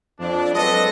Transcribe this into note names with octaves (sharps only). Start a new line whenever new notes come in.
F2 D4
F#3 G#3 C4 A4 B4 D#5